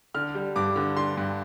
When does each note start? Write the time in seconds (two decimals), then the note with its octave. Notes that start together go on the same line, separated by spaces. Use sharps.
0.14 D3 F6
0.35 G3
0.56 G2 D6
0.76 D3
0.97 D3 C6
1.17 G2